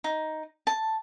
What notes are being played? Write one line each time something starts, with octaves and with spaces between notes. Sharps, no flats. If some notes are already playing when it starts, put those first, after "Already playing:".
D#4
A5